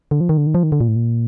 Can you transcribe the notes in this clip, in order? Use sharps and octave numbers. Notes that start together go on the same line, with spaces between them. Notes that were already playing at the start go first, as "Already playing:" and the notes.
D3
F3
D#3
D3
D#3
F3
D#3
D3
A#2
A2
A#2